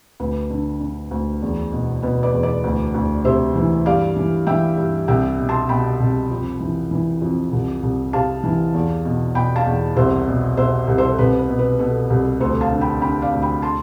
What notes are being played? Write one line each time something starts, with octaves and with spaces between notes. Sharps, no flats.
D2 B4
D3
D3
D2
E2
B2
B2 B4
B4 D5
E2
B4 D5
D2
D2
C3 C5 E5
E3
G2 D5 F5
E3
E3 E5 G5
G2
C2 E5 G5
B2
A5 C6
B2 G5 B5
C2
F2
E3
E3
F2
C2
C2
C3 F5 A5
E3
E2
B2
B2 G5 B5
F5 A5
E2
C2 C5 E5
B2
B2 C5 E5
C2
A4 C5
C2 B4
B4
B2
B4
B2 A4
C2
D2 A4 C5
F5 A5
D3
G5 B5
D3 G5 B5
D5 F5
D2
G5 B5
A5 C6